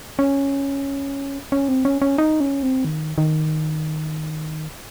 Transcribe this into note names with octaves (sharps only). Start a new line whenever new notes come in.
C#4
C#4
C4
C#4
C#4
D#4
C#4
C4
D#3
D#3